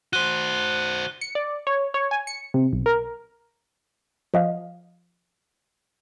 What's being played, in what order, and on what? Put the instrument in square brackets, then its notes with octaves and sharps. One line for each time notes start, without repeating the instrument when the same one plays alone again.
[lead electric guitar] F#4 C5 [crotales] F#6 D#7 G7
[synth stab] C#7
D5
C#5
C#5
G#5
C#7
C3
B1
A#4
[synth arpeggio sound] F3 D#5 F5